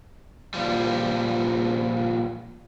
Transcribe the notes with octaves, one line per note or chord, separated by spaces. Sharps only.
A#2 F3 G3